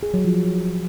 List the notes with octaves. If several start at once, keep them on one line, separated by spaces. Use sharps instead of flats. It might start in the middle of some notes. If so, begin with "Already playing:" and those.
G#4
F#3
F3